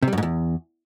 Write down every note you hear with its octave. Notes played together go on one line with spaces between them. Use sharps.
C3
G3
F#2
G#2
E2